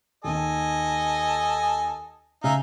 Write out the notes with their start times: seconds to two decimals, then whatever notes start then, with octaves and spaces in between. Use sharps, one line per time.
0.24 D#2 D#3 A4 D#5 G#5
2.44 C#3 D#4 E5 F5 G#5